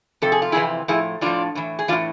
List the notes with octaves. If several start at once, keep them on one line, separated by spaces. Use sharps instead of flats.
F2 C3 A4
G#4
F4
F2 C3 E3 E4 G#4
A2 F3 E4 G#4
A2 F3 D4 F4
A2 E3
G#4
A2 E3 D4 F4